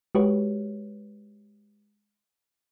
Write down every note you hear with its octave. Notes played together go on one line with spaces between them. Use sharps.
G#3 F#4 G4 B4 C#5